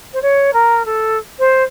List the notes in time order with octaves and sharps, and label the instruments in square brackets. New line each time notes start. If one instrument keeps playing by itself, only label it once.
[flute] C5
C#5
A#4
A4
C5